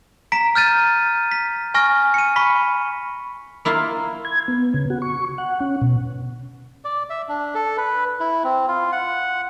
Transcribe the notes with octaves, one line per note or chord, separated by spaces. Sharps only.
A#5 B6 D7
F6 G6 A6 D#7
B6
G#5 C#6 F6 A#6
C#7 D#7
B5 C#6 B6
A#3 E4 F4 F5
G#6
B3
C#3
F#4
C#6
F#5
C#4
B2
D5
E5
D4
A4
B4
E4
C4
F4
F#5